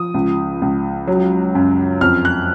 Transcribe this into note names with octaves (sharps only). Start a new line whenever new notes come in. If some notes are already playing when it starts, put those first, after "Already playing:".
Already playing: F3 D#6
C#2
C#2
F#3
F#2
F2 F6
F#6